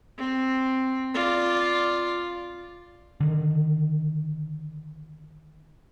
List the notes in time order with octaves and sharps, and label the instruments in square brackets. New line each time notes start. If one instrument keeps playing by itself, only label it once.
[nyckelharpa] C4
F4 D5
[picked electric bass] D3 D#3